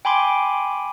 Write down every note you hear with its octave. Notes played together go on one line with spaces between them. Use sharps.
G5 G#5 B5 C6 D6